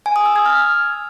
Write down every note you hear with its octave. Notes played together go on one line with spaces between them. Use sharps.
G#5
D#6
E6
G#6
F6